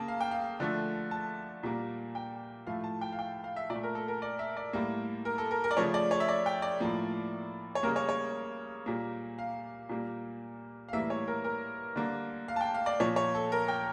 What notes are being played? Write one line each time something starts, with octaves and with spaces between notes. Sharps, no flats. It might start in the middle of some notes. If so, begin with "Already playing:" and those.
Already playing: C#3 A#3 A5
F5
G5
F5
D3 F3 A3
A5
A#2 G3 A#3
G5
A2 F3 A3 F5
A5
G5
F5
G5
F5
E5
A#2 D5
A3
A#4
A4
A#4
D5
E5
D5
A2 G3 A#3
A#4
A4
A#4
A#4
D5
C#3 F3 A3 C#5
D5
C#5
E5
D5
G5
D5
A2 F3 A#3
C#5
C#3 G3 A#3 A#4
C#5
C#5
A#2 G3 A#3
F5
A#2 G3 A#3
F5
A2 E3 G3 A#3 E5
C#5
A#4
A#4
D3 G3 A#3
F5
A5
G5
F5
D5
A#2 F3 A#3 C#5
C#5
A4
A#4
G5